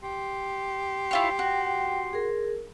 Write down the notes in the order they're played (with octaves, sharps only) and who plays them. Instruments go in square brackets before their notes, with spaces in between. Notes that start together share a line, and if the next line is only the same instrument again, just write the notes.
[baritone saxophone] G4 [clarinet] C6
[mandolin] E4 F4 C#5 [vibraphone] G5
[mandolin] F#4
[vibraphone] G#4 A#4